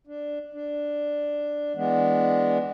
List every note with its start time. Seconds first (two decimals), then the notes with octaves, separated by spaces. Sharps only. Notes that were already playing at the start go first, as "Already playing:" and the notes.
0.07 D4
0.54 D4
1.76 E3 G#3 B3 D4